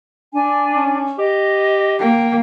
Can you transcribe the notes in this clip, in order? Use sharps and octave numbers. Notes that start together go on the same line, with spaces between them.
D4 G#5
C#4
G4 D#5
A#3 G5